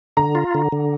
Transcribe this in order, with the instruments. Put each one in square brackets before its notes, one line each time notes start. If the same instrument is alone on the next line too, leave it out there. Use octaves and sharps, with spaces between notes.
[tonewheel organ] D3 [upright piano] A#5
[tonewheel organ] F4
D3
D3